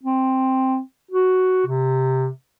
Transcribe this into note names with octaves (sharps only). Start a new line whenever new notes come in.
C4
F#4
C3